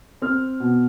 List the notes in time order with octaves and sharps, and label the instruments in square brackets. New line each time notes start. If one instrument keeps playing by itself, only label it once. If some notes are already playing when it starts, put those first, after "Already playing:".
[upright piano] C4 F6
B2